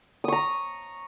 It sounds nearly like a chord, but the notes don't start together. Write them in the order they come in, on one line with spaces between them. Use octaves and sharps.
D#6 C#6 A#5